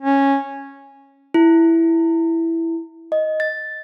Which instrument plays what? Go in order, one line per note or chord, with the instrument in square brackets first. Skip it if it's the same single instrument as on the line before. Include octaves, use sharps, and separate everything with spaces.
[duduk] C#4
[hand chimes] E4
D#5
A6